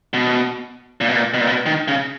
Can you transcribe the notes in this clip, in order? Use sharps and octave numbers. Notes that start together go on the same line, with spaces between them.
B2
A#2
B2
A#2
B2
A#2
B2
D#3
C#3